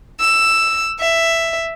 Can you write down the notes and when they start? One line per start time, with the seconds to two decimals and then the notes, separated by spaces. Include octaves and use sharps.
0.20 E6
0.99 E5